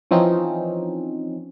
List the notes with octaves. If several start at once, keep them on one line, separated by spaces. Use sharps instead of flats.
E3 F3 C4 C#4 D#4